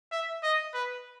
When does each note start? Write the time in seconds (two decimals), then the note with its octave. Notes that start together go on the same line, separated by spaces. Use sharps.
0.12 E5
0.43 D#5
0.74 B4